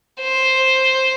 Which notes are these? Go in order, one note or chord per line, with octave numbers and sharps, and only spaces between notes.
C5